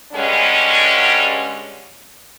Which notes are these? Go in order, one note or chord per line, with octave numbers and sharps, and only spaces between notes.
G2 D3 G3 G#3 C#4